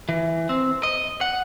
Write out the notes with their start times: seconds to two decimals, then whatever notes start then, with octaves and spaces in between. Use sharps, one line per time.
0.09 E3
0.49 C4
0.83 D#5
1.21 F#5